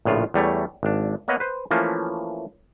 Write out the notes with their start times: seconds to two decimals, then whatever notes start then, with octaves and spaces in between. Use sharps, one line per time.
0.05 A#1 A2 C#3 F4
0.34 E2 G3 A3 C#5
0.83 G#1 D4
1.28 A#3 B3 C#5 D#5 F#5
1.40 B4 C5
1.71 E3 F3 A3 A#3 C#4